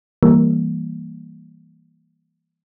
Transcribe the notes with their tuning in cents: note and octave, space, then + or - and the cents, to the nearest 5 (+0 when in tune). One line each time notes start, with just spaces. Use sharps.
E3 +5 G3 +15 A#3 +0